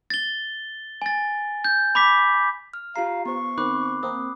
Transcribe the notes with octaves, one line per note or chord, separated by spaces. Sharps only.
A6 G7
G#5 A6
G6
B5 D6 B6
F6
F4 G4 F5 A#5 C7
B3 C5 C#6
D#3 C4 B5 D6 F#6
A#3 C4 A#4 D#6